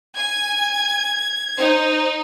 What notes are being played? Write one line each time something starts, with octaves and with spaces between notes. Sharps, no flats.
G#5 G#6
D#4 C5